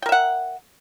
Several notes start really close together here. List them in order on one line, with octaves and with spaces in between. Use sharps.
G5 A#4 E5 F#5